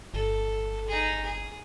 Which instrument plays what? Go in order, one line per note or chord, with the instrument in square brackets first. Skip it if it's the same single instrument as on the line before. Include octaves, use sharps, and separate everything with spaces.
[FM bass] G1 [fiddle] A4
[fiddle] D#4 G#4
G#4